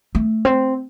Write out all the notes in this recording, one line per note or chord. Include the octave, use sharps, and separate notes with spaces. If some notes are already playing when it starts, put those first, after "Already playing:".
A3
C4